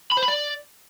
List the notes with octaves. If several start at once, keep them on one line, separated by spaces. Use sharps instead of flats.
B5
C5
B5
D5